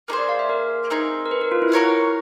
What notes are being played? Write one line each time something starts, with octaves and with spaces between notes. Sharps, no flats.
A#3 D#4 G#4 C5
D5
F5
E5
A#4
C4 D#4 G#4
A#4
B4
A#4
F4
E4
F#4 A#4 C#5 F5